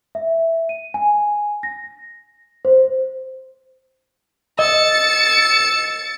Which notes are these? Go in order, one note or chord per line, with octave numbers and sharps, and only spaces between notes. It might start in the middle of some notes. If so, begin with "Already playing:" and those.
E5
D#7
G#5
A#6
C5
D#5 E6 A6 C#7